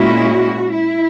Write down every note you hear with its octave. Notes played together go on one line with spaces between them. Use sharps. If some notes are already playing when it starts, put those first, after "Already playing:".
Already playing: A#2 G#3 C#4 E4 F#4
E4